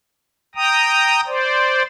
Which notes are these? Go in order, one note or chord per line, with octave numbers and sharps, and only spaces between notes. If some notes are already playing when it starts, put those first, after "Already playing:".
G5 A#5 D#6
C5 D5